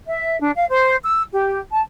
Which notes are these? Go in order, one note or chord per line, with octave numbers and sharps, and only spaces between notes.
E5
D4
F5
C5
E6
G4
A5